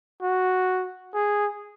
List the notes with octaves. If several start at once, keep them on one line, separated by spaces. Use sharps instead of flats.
F#4
G#4